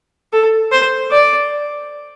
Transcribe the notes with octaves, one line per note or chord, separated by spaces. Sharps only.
A4
C5
D5